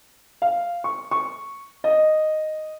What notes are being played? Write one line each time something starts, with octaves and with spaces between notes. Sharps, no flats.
F5
C#6
C#6
D#5